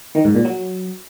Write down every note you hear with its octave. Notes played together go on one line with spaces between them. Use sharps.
D#3
G#2
A#2
F#3